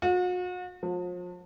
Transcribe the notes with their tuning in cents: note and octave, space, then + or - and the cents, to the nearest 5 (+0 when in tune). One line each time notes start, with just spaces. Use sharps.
F#4 -40
F3 +35